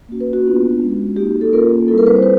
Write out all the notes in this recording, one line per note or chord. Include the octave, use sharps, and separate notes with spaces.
A#3 C#4 F#4
B4
F#4
B3 D4 F4
G#3 C#4 F#4
A#3 D#4 F#4 G4
A4
A#3 C#4 F4 A#4
G3 C4 E4 A4
A#4
B4
C5
B4